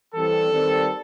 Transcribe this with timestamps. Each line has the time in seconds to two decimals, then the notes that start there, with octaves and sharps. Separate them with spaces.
0.15 E3 G3 C4 A4
0.52 D#3 G3 C4